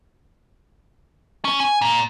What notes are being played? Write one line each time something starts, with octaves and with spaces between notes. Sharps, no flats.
C#4
G#5
A#2